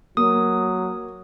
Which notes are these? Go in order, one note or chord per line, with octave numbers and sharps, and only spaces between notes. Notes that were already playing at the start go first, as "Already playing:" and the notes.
F#3 A#3 D#6